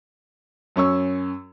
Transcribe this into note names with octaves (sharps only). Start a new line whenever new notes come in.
F#2 C#4 C#6 E6